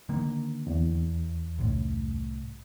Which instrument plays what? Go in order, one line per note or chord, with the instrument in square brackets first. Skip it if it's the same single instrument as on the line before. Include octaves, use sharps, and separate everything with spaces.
[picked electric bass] D3 D#3 A#3
[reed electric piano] E2
[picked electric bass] C2 A2